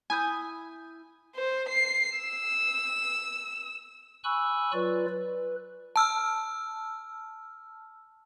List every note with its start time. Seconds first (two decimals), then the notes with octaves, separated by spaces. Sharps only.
0.10 E4 G#5 D#6 G6
1.36 C5
1.69 C7
2.19 E6
4.24 G#5 B5 C#6 E6 F#6
4.73 F#3 F4 B4 D5
5.09 B4
5.96 A5 E6 F6